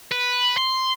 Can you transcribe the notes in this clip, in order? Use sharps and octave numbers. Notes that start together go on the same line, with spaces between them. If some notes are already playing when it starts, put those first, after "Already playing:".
B4
C6